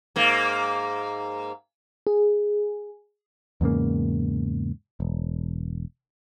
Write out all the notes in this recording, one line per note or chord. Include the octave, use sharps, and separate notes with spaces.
G#2 A#3
G#4
E2 G#2 C#3 A#3
E1